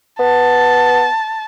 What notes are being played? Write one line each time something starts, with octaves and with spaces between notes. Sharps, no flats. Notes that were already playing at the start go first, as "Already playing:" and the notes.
B3 A5